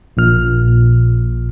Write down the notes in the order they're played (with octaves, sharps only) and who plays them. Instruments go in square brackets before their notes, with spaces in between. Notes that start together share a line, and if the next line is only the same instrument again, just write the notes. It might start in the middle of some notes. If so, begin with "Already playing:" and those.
[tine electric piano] A#1 A#2 F6